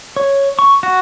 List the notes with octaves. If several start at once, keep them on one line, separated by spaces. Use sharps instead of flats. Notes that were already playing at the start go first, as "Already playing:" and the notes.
C#5
C#6
F#4